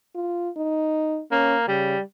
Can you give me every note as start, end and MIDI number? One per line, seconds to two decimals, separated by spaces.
0.15 0.49 65
0.57 1.21 63
1.31 1.64 58
1.31 1.55 61
1.68 1.95 49
1.68 2.01 55